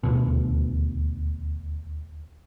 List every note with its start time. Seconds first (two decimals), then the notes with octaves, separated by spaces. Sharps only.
0.03 D#1 D2 B2